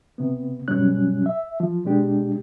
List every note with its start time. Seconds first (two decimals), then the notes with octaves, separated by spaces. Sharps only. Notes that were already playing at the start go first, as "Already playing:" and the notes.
0.18 C3 B3
0.68 G2 B2 F#3 G3 C#4 F#6
1.26 E5
1.60 F3
1.85 B2 G#3 D4 G4